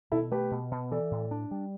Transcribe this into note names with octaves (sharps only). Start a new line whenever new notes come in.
B2 E4 A4
A3 G4 B4
B2
B2
E3 A4 D5
A2
D4
G3